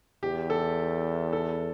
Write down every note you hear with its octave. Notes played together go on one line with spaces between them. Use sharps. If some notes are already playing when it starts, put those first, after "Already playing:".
E2 G4
A4
A4